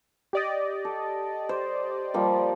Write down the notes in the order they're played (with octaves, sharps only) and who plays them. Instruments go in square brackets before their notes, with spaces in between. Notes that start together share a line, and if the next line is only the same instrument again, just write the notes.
[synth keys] G4 D5 D#5
[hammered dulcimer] A4
C5
F3 G3 A#3